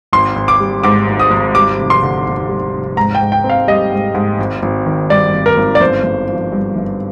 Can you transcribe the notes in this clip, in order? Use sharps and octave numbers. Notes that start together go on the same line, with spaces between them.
G#1 C6
G#1
D6
G3
G#2 D6
G#1
D#6
G#1
G3 D6
F1
C6
D3
D#2
G3
F1
G#2 A#5
G5
G#2
G5
C4
F5
G3 D#5
G#2
G#2
G#1
G#1
D#3
G2 D5
G#1
A#4
G#1
D5
G1 C5
G1
F3
G2
G1